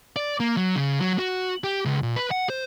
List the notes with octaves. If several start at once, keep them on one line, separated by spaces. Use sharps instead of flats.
D5
A#3
F#3
C#3
F#3
F#4
G4
C#2
A#2
B4
F#5
C5